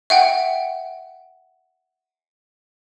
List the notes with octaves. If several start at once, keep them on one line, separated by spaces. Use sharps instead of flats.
E5 F#5 G5